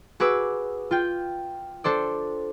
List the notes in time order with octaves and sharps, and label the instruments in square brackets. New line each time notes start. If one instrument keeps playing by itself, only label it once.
[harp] F#4 G#4 B4 D6 E6
F4 G5
D4 A4 C5 D5